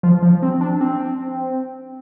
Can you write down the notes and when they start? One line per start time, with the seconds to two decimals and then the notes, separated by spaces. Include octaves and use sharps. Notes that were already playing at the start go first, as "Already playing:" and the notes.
0.03 F3
0.23 F3
0.43 C4
0.61 D4
0.81 C4